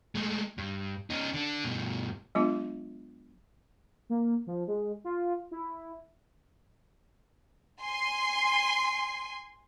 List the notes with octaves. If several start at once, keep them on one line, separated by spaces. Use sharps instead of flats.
G#3 A3
G2
C#4 D#4
D3 D4
G2 B2
F#3 G#3 B3 D4 F4
A#3
F3
G#3
F4
E4
G#5 C6